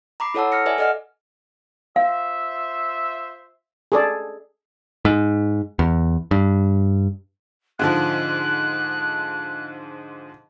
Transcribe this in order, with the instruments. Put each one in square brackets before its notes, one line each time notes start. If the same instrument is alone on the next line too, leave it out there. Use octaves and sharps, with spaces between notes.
[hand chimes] A#5 B5 D6 C7
E4 A4 C#5 F#5 A5 E6
F6 A#6 C#7
B4 D5 E5 G#5
A4 D5 D#5 F#5 F6
[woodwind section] F4 C5 E5 [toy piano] F5
[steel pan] G#4 A4 D5
[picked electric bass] G#2
E2
G2
[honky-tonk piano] G#2 D3 F3 [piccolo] F#6